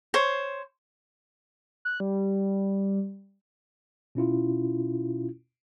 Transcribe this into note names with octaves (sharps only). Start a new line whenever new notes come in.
C5 C#5
F#6
G3
B2 C#4 E4 F4